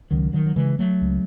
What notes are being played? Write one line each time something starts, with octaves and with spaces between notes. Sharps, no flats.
C#2 D#3 F#3
D#3 F#3
F#3
C#3 E3 G#3
F#3 A3
C#2